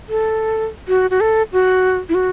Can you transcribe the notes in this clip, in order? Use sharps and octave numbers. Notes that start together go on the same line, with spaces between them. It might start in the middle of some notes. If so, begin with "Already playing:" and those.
A4
F#4
F#4
A4
F#4
E4
F#4